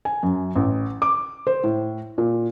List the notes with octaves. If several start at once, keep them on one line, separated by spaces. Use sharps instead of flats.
G#5
F#2
A1
D6
C5
A2
A#2